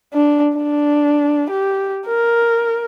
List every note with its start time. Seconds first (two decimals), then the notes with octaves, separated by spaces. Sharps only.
0.13 D4
0.56 D4
1.50 G4
2.06 A#4